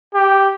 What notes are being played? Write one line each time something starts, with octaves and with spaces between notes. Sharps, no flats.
G4